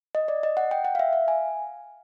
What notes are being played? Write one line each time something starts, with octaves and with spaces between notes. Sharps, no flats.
D#5
D5
D#5
F#5
G5
F#5
F5
E5
F5
G#5